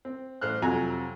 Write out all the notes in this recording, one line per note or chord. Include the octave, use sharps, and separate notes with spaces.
C4
A1 C5 F6 F#6
F2 C3 F#3 F4 G#5 A#5